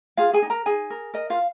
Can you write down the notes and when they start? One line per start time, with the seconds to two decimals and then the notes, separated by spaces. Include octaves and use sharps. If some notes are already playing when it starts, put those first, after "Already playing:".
0.17 F4 G#4 F5
0.33 G#4 G#5
0.42 D#4
0.50 A#4 A#5
0.66 D#4 G#4 G#5
0.90 A#4
1.14 A#4 D#5
1.30 F4 F5